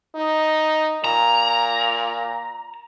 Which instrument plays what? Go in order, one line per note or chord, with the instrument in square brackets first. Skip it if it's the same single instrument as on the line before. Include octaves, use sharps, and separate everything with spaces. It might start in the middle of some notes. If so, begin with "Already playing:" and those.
[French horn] D#4
[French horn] A#2 [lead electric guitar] A#5